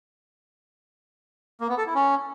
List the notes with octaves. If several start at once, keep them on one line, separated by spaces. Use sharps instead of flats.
A#3
B3
A4
E4
C#4